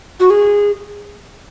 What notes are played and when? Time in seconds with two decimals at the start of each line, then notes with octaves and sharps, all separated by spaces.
0.20 F#4
0.30 G#4